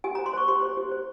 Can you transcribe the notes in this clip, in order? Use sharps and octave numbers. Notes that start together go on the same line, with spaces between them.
G4 G#5
A#5
C5
C6
C5 C#6
G4 C6
C5
G4
C5